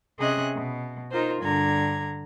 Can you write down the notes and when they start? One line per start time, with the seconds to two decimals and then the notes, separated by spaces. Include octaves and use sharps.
0.19 C3 C#4 G#4 D#5 E5 F#6
0.57 B2
1.12 D#4 F4 A#4 C5
1.42 G2 D3 A#5 G#6